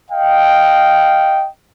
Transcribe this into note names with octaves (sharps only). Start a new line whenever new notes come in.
D#5 F5 G5